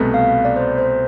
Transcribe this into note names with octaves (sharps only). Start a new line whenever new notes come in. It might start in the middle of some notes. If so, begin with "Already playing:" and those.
Already playing: C2 B2 A3
F5
D5
C5
C5